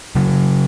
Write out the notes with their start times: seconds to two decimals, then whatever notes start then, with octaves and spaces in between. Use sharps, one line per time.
0.15 C#3 F#3